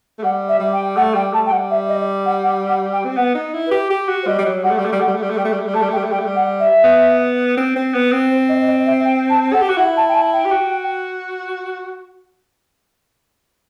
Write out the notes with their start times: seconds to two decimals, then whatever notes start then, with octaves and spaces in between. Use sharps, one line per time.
0.19 A3
0.23 G3 F#5
0.48 E5
0.60 G3
0.72 G5
0.96 A3 F#5
1.15 G3 G5
1.33 A3 A5
1.45 G5
1.51 G3 F#5
1.70 E5
1.88 D#5
2.25 F#5
2.43 F#5
2.68 F#5
2.92 G5
3.05 C4
3.16 B3 F#5
3.35 D#4
3.54 E4
3.66 B4
3.71 G4
3.90 G4
4.08 F#4
4.22 C5
4.27 G3 D#5
4.38 G3
4.45 F#3
4.63 G3 F#5
4.71 A3
4.78 G3
4.85 A3
4.93 G3
5.00 A3 F#5
5.08 G3
5.15 A3
5.22 G3
5.30 A3
5.37 G3 G5
5.45 A3
5.52 G3
5.60 A3
5.67 G3
5.74 A3 A5
5.82 G3
5.89 A3
5.92 G5
5.97 G3
6.04 A3
6.11 G3 G5
6.19 A3
6.26 G3
6.35 F#5
6.59 E5
6.84 B3
7.57 C4
7.76 C4
7.94 B3
8.12 C4
8.30 C5
8.48 D#5
8.67 D#5
8.85 E5
9.04 G5
9.29 A5
9.53 A4 F#5
9.61 G4
9.69 F#4
9.77 E4 F#5
9.96 A5
10.08 G5
10.14 A5
10.32 G5
10.45 G4
10.51 F#4